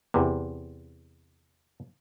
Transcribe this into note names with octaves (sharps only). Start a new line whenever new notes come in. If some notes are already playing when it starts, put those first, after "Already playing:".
E2 C3